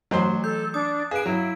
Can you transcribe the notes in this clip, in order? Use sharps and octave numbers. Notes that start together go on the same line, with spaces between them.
E3 F#3 A3 C5 C6
A4 G6
D4 D#6
G#4 B4 F5 D7
F#3 E4